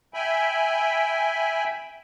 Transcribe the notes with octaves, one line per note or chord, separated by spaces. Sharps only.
E5 G5 G#5 B5